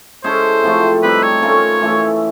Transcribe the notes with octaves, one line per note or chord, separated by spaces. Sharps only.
G#3 C#4 E4 A4 C5
C3 F3 A3
G3 C4 D#4 B4
C#5
A3 C#4 F4 A#4
E3 A3 C#4 E4